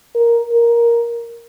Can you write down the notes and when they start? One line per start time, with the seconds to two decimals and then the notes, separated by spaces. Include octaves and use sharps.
0.15 A#4
0.52 A#4